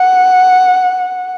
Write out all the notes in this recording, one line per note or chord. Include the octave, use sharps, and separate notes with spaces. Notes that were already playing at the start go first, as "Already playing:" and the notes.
Already playing: F#5